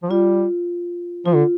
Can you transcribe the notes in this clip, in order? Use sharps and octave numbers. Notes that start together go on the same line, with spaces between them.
F3
G3 F4
F3 F4
D3